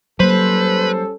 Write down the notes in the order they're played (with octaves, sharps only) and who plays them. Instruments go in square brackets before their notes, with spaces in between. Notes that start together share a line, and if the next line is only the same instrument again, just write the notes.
[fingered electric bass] F#3 A#3 [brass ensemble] G3 C#4 A4 [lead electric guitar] B4 [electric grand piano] C5